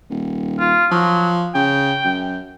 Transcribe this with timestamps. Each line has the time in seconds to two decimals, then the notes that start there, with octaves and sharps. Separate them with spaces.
0.10 D#1
0.60 F4
0.91 F3 F#3
1.55 C#3 G5
2.05 F#2